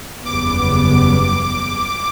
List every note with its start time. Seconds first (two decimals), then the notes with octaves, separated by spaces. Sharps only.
0.25 F#1 E2 C#3 G3 B3 D6